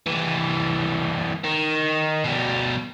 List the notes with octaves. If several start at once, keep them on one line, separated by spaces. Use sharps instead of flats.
E3 G3
D#3
B2 G3